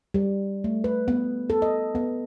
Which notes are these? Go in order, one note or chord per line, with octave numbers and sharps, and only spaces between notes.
G3
A3
B4
B3
A4
D#5
B3